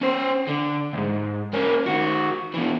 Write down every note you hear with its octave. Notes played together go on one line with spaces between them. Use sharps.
C#4 C5
D3
D2 G#2
A#3 C#4
D#3 F#4
B2 E3